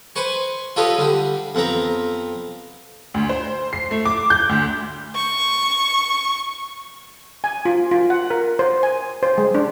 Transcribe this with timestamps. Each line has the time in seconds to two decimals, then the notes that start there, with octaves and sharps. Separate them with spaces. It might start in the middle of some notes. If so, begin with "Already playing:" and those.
0.16 B4 C5 G#5 C#6
0.76 F4 G4 A4 B4 C#5 D#5
0.98 D3 G3
1.55 F2 B3 C4 A#5
3.14 D2
3.29 C5
3.73 C7
3.91 A3
4.05 D6
4.30 G6
4.49 D2
5.16 C#6
7.44 G#5
7.65 F4
7.91 F4
8.10 F#5
8.30 A#4
8.59 C5
8.83 G#5
9.23 C5
9.38 G#3
9.55 D4